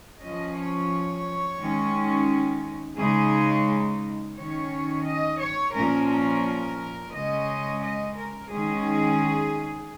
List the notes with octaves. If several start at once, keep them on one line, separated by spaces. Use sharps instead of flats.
F3 C#4 D#5
C#5
D#3 G#3 C#4
C#3 G#3 D#4 G#4
D#3 C#4 C#5
D#5
C#5
A#2 F3 C#4 A#4
A#4
C#3 G#3 C#4 D#5
D#5
A#4
D#3 G#3 C#4 G#4